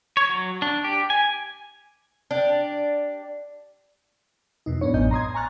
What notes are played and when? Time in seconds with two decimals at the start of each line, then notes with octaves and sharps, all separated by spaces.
0.17 C#5
0.29 F#3
0.62 D4
0.84 G4
1.10 G#5
2.31 D4 G4
4.66 F2 B2 D#4
4.81 A2 B3 D4 C#5
4.94 A1 F#2 B3 D#5 G6
5.11 A#5 C6 D#6 G#6
5.34 G#5 A#5 C#6 F6 F#6 A6